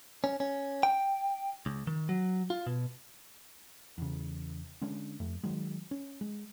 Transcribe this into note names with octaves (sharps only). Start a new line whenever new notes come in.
C#4
C#4
G5
C#2
D#3
F#3
F4
B2
E2 C#3
D3 G#3 C#4 D4
F2 A3
D#3 F#3 G#3
C#4
G#3